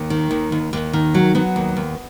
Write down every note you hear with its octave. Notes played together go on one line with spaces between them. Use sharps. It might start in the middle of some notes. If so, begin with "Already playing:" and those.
Already playing: D#2
D#3
D#2
D#2
D#2
D#3
F#3
F#3 B3
D#2
D#2